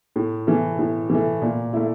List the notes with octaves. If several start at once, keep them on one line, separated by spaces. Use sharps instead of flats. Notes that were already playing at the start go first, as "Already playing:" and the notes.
A2
E3 A3
A2
E3 A3
A#2
A3 E4